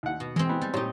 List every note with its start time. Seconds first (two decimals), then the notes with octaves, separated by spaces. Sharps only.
0.03 D#2 F#5
0.20 B2
0.36 E3 G#3 C4
0.49 B3
0.62 G3
0.74 A#2 D#4 G4 C5 C#5